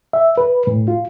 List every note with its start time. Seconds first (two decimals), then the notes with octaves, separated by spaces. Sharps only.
0.13 E5
0.37 B4
0.67 A2
0.88 F4